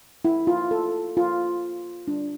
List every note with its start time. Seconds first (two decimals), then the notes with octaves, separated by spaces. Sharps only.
0.25 E4
0.47 F4
0.71 A4
1.17 F4
2.08 D4